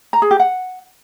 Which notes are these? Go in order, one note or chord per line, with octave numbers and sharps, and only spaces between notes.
A#5
G#4
G4
F#5